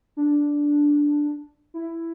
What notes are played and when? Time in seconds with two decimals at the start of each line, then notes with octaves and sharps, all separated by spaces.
0.17 D4
1.74 E4